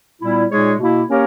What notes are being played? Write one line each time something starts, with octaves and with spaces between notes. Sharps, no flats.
A#2 G3 B3 E4
A#2 G#3 D#4 G#4 C#5
B2 A#3 E4
A#3 C#4 G4 A#4 C#5